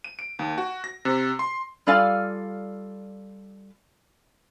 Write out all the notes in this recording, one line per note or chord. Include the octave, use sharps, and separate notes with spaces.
D#7
D7
D#2
F#4
A#6
C3
C6
G3 F4 A4 D5 F5 G#5